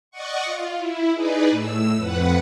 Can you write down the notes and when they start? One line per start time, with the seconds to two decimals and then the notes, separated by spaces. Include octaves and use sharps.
0.11 D5 D#5 F#5 C#6
0.45 F4
0.77 E4
1.13 D#4 G#4 B4 D5
1.51 A2 E6
1.97 F2 B4 F#5